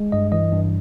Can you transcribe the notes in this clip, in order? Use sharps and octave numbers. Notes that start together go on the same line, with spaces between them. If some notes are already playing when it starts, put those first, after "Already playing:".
Already playing: G#3
G2 D#5
E3 D#5
G2